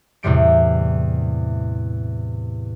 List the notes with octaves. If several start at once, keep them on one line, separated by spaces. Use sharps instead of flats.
E2 A2 C3 G3 D7